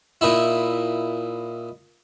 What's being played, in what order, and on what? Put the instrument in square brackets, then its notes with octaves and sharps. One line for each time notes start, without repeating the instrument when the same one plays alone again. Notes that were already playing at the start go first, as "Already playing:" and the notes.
[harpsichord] A#2 D#4 E4